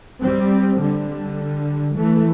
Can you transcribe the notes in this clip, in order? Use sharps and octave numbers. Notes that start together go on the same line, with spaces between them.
G3 C4
D3 G3
E3 A3